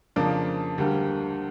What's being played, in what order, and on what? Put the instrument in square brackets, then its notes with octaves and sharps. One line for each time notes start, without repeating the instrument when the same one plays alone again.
[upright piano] F2 C#3 F3 A#3 D4
D2 D3 G3 A#3